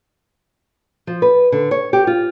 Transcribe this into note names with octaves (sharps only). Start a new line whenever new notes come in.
F3
B4
D3
C#5
G4
F4